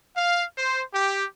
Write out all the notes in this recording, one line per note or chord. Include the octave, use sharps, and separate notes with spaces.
F5
C5
G4